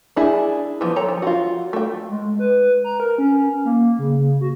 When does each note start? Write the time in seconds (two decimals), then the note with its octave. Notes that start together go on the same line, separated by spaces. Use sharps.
0.16 D4 E4 G#4 G#5
0.81 E3 F3 B3
0.96 A4 C#5 G5 A#5
1.09 F3
1.22 F4 F#4
1.73 A3 G5
2.10 G#3
2.39 B4
2.84 A#5
3.00 A#4
3.18 C#4
3.65 A#3
3.99 C#3
4.41 F#4